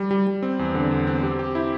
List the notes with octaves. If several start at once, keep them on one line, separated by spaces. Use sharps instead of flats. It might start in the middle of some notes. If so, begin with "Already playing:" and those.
Already playing: G3
G3
G3
C4
E2
D3
E2
C4
G4
G4
E4